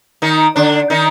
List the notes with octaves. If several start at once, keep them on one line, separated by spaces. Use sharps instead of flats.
D#3 D#4
D3 D4
D#3 D#4